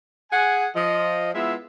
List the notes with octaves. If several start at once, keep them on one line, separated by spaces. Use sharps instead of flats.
G#4 F#5 G#5
F3 D#5
G#3 B3 E4 F4 E5